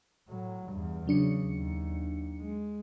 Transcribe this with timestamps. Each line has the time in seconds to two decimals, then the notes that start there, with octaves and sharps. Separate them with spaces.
0.28 A2 F#3
0.68 E2 G2
1.07 C#3 F#3 D4 C#7
1.45 D#2
2.40 G#3